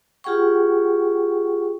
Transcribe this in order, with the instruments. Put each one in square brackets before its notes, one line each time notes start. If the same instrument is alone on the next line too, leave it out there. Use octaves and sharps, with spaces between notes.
[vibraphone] F4 G4 G#4 F#5 G5 C#6